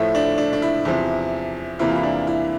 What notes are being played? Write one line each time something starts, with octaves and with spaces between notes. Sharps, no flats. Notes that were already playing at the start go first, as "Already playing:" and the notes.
Already playing: A2 F3 A3 E4
D4
D4
D4
E4
E2 C3 F3 E4
E2 C3 E3 A#3 E4
F4
E4
D4
E4